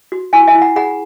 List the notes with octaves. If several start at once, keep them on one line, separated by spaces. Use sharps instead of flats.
F#4
E4 G#5 C#6
E5 G#5
E4
F#5 B5
G#4 F#5 B5